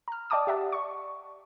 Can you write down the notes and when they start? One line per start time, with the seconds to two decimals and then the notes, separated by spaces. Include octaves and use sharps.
0.08 A#5 F6
0.30 D5 D#5 G5 A5 D6 D#6
0.47 G4 E5 F#5 A5
0.72 D5 C#6